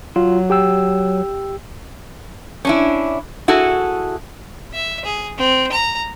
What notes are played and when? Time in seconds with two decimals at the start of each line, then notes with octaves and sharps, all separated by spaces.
0.16 F#3 F4
0.50 G4 G5 E6
2.65 C#4 D4 E4
3.48 E4 F#4 G#4 A4
4.73 E5
5.05 G#4
5.38 C4
5.72 A#5